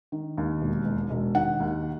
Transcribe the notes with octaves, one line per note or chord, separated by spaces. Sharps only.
D#3
D#2
E1
E1
E1
D#3 F#5
D#2